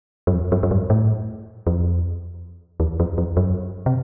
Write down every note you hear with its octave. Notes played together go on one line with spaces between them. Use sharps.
F#2
F2
F#2
F#2
G2
A2
F2
E2
F2
F2
F#2
C3